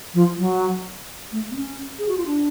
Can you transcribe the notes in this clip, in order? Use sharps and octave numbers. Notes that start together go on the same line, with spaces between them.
F3
F#3
A3
B3
C#4
G#4
F#4
F4
D4